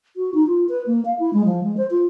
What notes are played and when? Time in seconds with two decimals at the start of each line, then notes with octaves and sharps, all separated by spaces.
0.17 F#4
0.34 D#4
0.47 F4
0.69 B4
0.87 A#3
1.05 F5
1.19 E4
1.33 G#3
1.45 F3
1.63 G#3
1.77 C5
1.91 F4